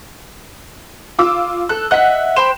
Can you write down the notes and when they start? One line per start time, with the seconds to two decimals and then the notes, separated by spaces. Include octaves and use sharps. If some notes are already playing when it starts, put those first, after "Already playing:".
1.19 F4 D6 E6
1.69 A4 F#6
1.91 D#5 E5 F#5 F#6 B6
2.36 C5 G5 B5 E7